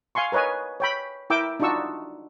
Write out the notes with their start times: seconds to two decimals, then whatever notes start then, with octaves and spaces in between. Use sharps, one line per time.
0.15 F5 G#5 C6 C#6
0.32 A#4 B4 C#5 D#5 G#5
0.80 C#5 G5 B5
1.30 E4 A#4 G5 D6 E6
1.60 D4 D#4 F4 F#4 C#6 E6